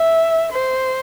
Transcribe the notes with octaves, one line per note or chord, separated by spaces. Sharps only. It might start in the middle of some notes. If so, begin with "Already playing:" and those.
Already playing: E5
C5